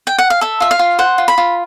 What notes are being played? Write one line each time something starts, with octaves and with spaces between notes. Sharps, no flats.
G5
F#5
F5
A4 E5
F4 E5
F5
F4
C5 F#5
F4
B5
F4